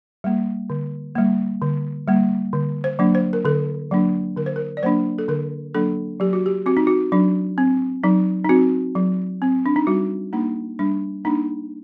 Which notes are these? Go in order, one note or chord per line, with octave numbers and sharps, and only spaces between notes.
G3 A#3
D3
G3 A#3
D3
G3 A#3
D3
C5
F#3 A#3 D4
C5
A#4
D3 A4
F#3 A#3 D4
D3 A#4
C5
A#4
D5
F#3 A#3 D4 C5
A4
D3 A#4
F#3 A#3 D4 A4
F#3 G4
F#4
G4
C4 F#4
D#4
F#4
F#3 D4
C4
F#3 D#4
D#4
C4 F#4
F#3
C4
D4
D#4
G3 F#4
A#3 D4 D#4
G3 D4
A#3 D4 D#4